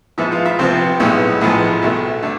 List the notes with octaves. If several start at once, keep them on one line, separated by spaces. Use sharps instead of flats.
G#2 F3 B3 E4 E5
F4 F5
E4 E5
C2 C3 F3 B3 C4 C5
B1 A2 G#3 B3
A1 A2 F3 G#3 B3 B4
C2 B2 A3
D3 A3